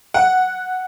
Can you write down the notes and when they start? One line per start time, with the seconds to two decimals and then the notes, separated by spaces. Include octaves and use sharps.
0.14 F#5